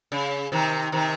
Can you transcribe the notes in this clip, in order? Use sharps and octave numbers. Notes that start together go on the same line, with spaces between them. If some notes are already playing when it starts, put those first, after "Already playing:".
C#3
C3 D#3
C3 D#3